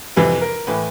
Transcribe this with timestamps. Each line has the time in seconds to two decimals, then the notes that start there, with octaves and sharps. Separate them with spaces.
0.16 F2 C3 E3 B4
0.41 A#4
0.67 A2 E3 B4